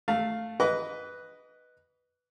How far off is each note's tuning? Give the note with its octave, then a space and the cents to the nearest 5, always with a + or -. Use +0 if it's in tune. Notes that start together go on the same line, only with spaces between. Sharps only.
A3 +0 F5 +0
B4 +0 D#5 +0 D6 -40